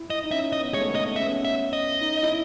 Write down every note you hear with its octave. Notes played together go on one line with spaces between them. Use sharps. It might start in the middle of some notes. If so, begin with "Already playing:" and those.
Already playing: E4
D#5
D#4
C#4 E5
D#5
B3
G#3 C#5
A3
B3
D#5
C#4 E5
B3
C#4
E5
D#5
D#4
E4